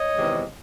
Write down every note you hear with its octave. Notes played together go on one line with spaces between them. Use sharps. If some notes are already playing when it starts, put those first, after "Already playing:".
Already playing: C#5 D#5
E2 C3 D#3 G#3